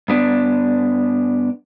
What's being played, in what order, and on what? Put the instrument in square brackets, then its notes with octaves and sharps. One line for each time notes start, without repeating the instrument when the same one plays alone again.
[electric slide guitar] G2 B3 D4